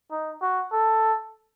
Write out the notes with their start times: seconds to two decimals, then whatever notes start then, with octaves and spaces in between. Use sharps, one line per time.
0.12 D#4
0.42 F#4
0.72 A4